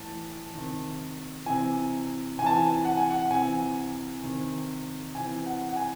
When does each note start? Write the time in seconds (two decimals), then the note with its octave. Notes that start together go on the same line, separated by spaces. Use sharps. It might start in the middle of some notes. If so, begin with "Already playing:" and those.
Already playing: A2 E3 A5
0.54 C3 D#3
1.46 C3 E3 G#5
2.38 C3 G#5
2.42 E3 A5
2.53 G#5
2.85 F#5
2.97 G#5
3.11 F#5
3.30 C3 E3 G#5
4.24 C3 D#3
5.15 C3 E3 G#5
5.46 F#5
5.69 F#5
5.76 G#5